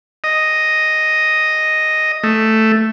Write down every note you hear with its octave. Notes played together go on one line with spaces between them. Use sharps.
D#5
A3